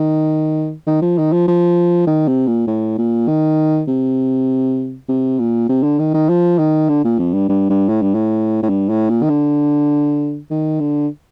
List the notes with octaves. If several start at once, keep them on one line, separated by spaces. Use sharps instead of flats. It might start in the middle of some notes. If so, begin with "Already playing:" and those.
Already playing: D#3
D#3
F3
D#3
F3
F3
D#3
C3
A#2
A2
A#2
D#3
C3
C3
A#2
C3
D3
D#3
D#3
F3
D#3
D3
A#2
F2
G2
G2
G2
A2
G2
A2
A2
G2
A2
A#2
D#3
D3
D#3
D3